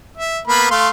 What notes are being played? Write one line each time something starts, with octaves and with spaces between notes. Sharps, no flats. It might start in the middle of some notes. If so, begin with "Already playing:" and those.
E5
A#3 B3 B5
A3 F5 C6